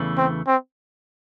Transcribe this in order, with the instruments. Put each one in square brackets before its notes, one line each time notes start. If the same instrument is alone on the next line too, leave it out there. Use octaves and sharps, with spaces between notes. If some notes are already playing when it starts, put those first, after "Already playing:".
Already playing: [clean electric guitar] E2 C#3 E3 A3
[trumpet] C4
C4